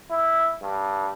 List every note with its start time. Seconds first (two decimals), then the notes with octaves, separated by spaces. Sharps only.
0.11 E4
0.62 G2